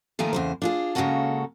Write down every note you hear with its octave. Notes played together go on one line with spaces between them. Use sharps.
A#2 D#3 F3 A3 A#4 G#5
E2 C#3 C5
D4 F4 G#4
C#3 G#3 A#3 C#4 F#4 A4